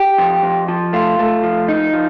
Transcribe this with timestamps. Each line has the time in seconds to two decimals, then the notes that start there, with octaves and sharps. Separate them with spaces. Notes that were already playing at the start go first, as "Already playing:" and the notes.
Already playing: G4
0.18 F2
0.43 F2
0.68 F3
0.93 A3 F4
1.19 A3
1.43 F3
1.68 D#4
1.93 F3